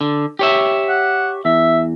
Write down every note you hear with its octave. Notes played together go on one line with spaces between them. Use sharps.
D3
G4 C#5 E5
F#5
E2 E5